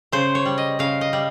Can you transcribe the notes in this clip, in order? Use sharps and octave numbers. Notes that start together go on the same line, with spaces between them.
C#3 C5
C#5
G3
D#5
C#3 F5
D#5
G3